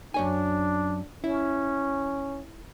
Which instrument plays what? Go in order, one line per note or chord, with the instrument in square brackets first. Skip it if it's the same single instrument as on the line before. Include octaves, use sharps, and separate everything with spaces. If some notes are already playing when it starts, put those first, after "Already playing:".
[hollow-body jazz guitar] F#2 C#5 G#5 [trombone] D4
[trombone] C#4 [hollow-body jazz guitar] E4